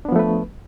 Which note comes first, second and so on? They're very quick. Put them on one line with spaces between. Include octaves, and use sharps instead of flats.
D4 B3 F3 A3 B4